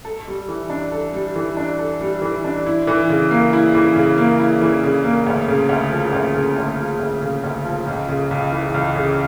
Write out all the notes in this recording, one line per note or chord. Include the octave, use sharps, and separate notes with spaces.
A4
G3
E3
D4
A4
G3
E3
D4
A4
G3
E3
D4
E4
E3
C#3
A#3
E4
E3
C#3
A#3
E4
E3
C#3
A#3
D2
C#3
D2
F3
D2
C#3
D2
F3
D2
C#3
D2
F3
C#2
C#3
C#2
E3
C#2
C#3